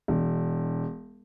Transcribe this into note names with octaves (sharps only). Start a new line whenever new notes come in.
E1